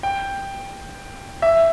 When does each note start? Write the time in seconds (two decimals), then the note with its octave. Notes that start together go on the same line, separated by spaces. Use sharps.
0.03 G5
1.42 E5